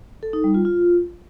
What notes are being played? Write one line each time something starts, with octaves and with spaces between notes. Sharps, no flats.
A4
D#4
G3
F4
F4